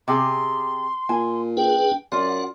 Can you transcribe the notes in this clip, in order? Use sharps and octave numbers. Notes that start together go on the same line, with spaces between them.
C3 G4 G#4 C6
A#2 G#5
D4 G#4 B4 G5
F#2 F4 D5 F#5